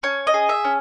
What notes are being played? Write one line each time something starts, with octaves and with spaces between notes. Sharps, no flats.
C#4 C#5
D#5
G#4
E5
C#4